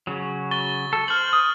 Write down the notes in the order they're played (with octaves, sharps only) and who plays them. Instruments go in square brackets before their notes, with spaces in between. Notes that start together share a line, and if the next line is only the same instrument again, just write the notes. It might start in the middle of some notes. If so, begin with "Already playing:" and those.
[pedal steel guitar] C#3 F#3
[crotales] C#6 A6 G7
[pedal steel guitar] A4
[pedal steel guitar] C5 [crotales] F6 F#7
[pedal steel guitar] D#6